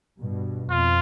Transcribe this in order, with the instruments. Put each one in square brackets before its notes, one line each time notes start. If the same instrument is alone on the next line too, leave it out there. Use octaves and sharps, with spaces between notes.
[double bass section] G2 B2
[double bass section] F2 [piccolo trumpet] F4